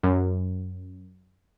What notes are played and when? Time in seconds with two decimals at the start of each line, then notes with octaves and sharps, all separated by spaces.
0.03 F#2